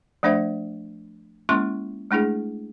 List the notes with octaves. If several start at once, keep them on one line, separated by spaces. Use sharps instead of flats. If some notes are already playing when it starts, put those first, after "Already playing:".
F3 A3 D4 C5 E5
G#3 A#3 C#4 E4 C6 C#6
G#3 A3 D4 E4 G#4